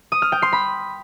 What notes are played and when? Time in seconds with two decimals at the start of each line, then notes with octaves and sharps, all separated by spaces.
0.12 D#6
0.22 F6
0.32 G5
0.42 C6
0.52 B5